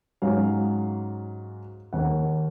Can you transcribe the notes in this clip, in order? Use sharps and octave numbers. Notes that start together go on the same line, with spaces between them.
G#2 F#3 C#4 F5
D#2 D#3 A#3 F#5